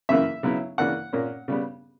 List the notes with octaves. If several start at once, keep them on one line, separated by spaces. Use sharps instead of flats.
F#2 C#3 E3 A#3 E5
C#3 F#3 B3 E4
C#3 E3 A#3 D4 F#5
A#2 A#3 C#4
C#3 G3 B3